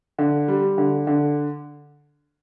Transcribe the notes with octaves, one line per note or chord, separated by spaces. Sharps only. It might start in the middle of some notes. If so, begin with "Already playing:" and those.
D3
G3
D3
D3